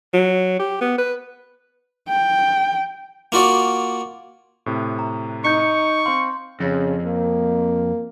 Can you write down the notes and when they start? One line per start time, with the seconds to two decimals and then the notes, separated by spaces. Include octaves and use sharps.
0.13 F#3
0.59 G4
0.81 B3
0.98 B4
2.09 G5
3.32 A#3 F4 F#4 D5
4.66 A2 C3
4.99 A#5
5.45 D#4 C#6 G6 C#7
6.06 C4 F5 C6
6.60 F2 C#3
7.06 A#3